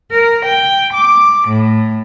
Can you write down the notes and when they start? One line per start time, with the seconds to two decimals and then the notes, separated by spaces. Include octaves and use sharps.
0.11 A#4
0.45 G5
0.93 D6
1.48 A2